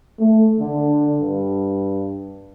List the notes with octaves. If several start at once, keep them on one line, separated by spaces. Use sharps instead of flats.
A3
D3
G2